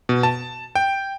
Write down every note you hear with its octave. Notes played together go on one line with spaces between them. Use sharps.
B2
A5
G5